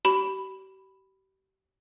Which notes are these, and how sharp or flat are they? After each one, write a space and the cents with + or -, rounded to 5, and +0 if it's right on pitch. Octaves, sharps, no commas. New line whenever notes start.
G4 -40 B5 +5